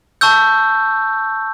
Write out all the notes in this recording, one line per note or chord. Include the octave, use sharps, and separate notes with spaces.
A5 C#6 E6 G6